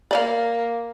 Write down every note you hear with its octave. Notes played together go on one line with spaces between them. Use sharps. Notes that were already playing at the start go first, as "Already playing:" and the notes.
A#3 D5 D#5 F5